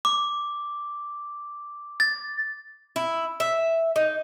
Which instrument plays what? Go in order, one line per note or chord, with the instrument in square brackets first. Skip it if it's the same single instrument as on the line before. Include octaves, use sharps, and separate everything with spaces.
[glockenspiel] D6
A6
[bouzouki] E4
E5
D#4